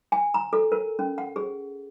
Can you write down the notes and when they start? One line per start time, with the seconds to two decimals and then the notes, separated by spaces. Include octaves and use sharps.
0.12 G#5
0.34 A#5
0.53 A4
0.72 A#4
0.99 C#4
1.18 F#5
1.36 G#4